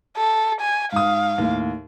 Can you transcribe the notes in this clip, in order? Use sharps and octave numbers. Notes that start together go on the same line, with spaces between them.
A4
G#5
G#2 F5 D#6
D#2 A2